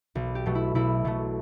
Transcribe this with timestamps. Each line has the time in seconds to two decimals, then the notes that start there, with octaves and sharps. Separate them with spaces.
0.15 B1
0.35 G4
0.46 B2 F#3 A3
0.55 E4
0.75 B1 E4
1.05 B2 F#3 A3